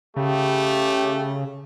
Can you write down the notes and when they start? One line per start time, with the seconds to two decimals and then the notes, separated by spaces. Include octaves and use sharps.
0.16 C#3 A3 G4